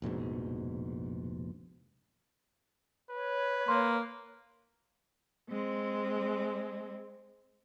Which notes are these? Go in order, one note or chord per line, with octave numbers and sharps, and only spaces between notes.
F1 A#1 G#2 B2
B4 C#5
A#3 C6
G#3 C4